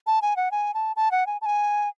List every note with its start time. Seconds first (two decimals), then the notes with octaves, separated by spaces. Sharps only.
0.07 A5
0.22 G#5
0.37 F#5
0.51 G#5
0.74 A5
0.96 A5
1.11 F#5
1.27 G#5
1.41 A5
1.46 G#5